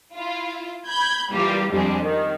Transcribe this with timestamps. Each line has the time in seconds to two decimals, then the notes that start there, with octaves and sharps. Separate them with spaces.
0.14 E4 F4
0.88 B5 G6 G#6
1.31 E3 G3 A#3 F4 G4
1.72 F2 G3 G#3 C4 D4
2.05 D#3